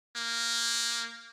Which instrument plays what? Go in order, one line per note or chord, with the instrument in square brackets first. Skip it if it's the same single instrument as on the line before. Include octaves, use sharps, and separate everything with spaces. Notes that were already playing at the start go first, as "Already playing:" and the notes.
[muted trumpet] A#3